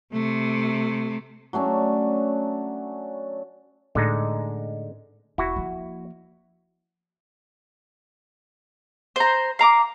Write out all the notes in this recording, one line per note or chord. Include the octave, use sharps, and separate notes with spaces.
C3 A3
F#3 A3 C#4 D4
A2 D3 G#3 D#4
E1 E4 F#4
F3 A#3
C5 A#5
F5 A#5 D6